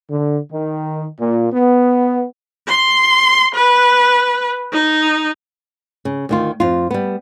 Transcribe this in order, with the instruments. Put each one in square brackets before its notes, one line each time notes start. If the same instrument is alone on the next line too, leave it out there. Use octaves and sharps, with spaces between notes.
[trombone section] D3
D#3
A#2
B3
[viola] C6
B4
D#4
[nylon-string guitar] C#3
D2 D#3 F4
F2 F4
G3 B3